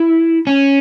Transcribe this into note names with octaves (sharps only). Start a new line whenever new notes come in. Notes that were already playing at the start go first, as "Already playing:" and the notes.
Already playing: E4
C#4